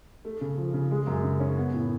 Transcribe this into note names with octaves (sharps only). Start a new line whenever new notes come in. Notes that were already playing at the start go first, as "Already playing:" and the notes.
A3
C#3
F3
C#3
G#3
F#2
C#3
C#4
B3
A2